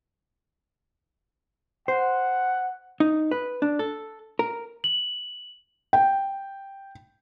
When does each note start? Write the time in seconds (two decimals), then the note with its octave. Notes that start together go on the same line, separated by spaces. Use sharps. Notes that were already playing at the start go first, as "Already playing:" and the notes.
1.88 C5 F#5
3.00 D#4
3.31 B4
3.62 D4
3.79 A4
4.39 A#4
4.84 F#7
5.93 G5